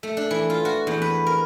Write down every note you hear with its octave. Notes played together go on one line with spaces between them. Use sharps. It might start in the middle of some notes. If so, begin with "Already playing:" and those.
A3
D4
E3
F4
F#4
E2
B4
A#4